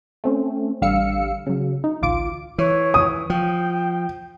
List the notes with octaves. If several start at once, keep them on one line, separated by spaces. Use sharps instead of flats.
A3 C4 C#4
A1 D3 G3 F5 E6 C#7
C#3 F#3
D#4
A1 D2 F4 D6 D7
E3 C#5
D#6
F3 G5